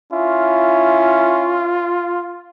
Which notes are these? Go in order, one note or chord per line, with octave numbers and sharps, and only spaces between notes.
C#4 E4 F4